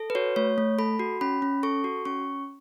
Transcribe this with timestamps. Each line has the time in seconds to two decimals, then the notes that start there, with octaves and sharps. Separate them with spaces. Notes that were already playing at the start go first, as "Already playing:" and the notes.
Already playing: A4
0.10 B4
0.15 F#4 C#5
0.36 A3 C#5
0.58 A3
0.78 A4 B5
0.99 F#4
1.21 C#4 B5
1.42 C#4
1.63 A4 C#6
1.84 F#4
2.05 C#4 C#6